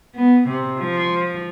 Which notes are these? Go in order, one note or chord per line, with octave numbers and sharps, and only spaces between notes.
B3
C3
F3